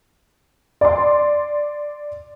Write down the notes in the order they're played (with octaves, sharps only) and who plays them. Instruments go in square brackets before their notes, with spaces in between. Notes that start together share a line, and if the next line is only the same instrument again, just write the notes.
[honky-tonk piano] D5 C6